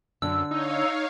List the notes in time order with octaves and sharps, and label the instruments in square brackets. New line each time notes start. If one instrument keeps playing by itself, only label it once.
[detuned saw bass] F#2 [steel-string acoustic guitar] D3 [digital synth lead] E6
[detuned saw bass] D#4 [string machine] C#5 F5